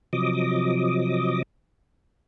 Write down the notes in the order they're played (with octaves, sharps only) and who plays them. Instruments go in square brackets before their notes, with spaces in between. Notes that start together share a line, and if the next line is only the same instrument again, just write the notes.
[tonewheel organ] C3 F3 F#3 D#5 D6 D#6